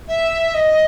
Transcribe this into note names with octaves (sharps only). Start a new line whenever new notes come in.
E5
D#5